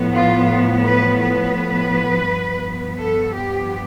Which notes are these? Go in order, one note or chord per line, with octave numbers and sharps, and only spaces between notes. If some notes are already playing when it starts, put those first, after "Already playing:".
Already playing: A2 F3 B3
F4
B4
B4
G2 F3 B3
A4
G4